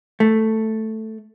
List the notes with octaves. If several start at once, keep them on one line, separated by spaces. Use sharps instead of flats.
A3